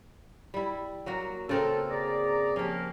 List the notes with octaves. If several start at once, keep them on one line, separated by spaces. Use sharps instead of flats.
G3 E4
F#3 A#3 F#4
C#3 C4 A4 A#4
G#4 D5 A#5
F3 A#3 C#4 G4